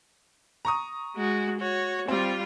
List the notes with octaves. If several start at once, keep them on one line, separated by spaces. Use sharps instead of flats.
A#5 C#6 D#6
G#3 F#4
F#4 C#5
G3 C4 F4